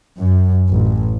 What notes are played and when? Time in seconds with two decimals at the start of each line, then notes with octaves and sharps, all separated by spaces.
0.19 F#2
0.70 A1